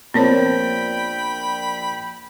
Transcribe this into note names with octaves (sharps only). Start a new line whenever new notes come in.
A#1 B3 C4 A#4 C5 C#5 G5 B5